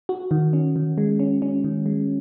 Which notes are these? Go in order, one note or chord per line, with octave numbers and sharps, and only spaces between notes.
F#4
D#3
C#4
D#3
G#3
C#4
C#4
D#3
G#3